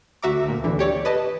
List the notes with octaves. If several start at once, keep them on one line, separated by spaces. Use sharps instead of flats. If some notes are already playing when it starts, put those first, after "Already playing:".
D2 F#4 E5 A#5 D6
D2 A#2
G#1 D2 D3 E3
G4 C#5 D5
B4 D#5 A5